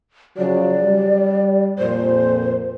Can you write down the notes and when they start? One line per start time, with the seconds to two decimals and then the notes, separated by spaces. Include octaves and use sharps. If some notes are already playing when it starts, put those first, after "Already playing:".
0.37 C#3 F3 F#3 D5
0.82 G3
1.79 F2 A#2 C5